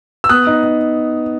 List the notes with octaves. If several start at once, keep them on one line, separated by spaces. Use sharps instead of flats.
E6
B3 D#6 F#6
D#4
D#4